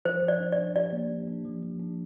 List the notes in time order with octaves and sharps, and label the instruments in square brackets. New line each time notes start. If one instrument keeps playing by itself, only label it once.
[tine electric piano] F3 [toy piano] C5
[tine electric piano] F3
[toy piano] D5
[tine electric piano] D4
[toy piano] D5
[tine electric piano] D4
[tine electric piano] G4 [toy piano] D5
[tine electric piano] A#3
D4
D4
F3
F3
D4